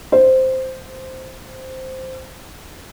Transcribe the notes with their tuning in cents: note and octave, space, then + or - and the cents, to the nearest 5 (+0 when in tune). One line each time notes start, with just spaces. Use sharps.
C5 -5